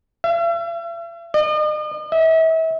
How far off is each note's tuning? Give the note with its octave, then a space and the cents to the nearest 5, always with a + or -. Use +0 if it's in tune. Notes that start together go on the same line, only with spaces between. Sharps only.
E5 +45
D#5 -45
E5 -35